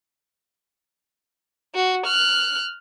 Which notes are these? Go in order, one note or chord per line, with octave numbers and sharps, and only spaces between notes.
F#4
F6 F#6